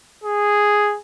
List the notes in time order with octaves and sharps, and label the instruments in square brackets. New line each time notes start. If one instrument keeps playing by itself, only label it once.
[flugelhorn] G#4